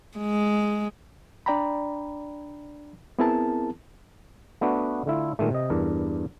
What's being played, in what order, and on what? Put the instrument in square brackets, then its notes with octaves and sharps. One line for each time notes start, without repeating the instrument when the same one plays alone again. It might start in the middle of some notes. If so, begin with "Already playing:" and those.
[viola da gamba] G#3
[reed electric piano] D4 D5 G5 A#5 B5
B3 C4 E4 G#4 A#4 A5
[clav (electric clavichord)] A3 B3 D4 F#4 B4
D3 A3 E4 F4
A#2 D#3 G#3 A3
C3 D#5
E2 G2 D4 A#4